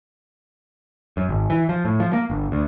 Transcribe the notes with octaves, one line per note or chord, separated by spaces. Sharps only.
F#2
G#1
E3
F3
A2
F3
A#3
G1
D2